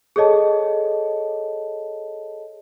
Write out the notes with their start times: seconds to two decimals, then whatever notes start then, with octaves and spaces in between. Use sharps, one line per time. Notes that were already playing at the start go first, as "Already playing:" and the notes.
0.16 G#4 A4 C#5 D#5 A5